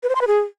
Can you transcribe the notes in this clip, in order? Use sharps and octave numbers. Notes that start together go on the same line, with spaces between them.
B4
C5
C6
B4
G#4